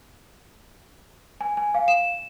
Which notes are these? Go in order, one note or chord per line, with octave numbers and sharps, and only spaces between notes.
G#5
G#5
F5
E7